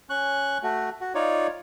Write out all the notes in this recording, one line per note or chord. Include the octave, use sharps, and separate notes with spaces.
C#4 C#6 F#6
A3 F#4
F#4
D#4 F4 C#5 D5